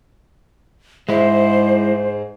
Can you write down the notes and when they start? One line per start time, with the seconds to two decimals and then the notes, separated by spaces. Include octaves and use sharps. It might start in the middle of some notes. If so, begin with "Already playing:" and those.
1.09 G#2 G#3 E4 C5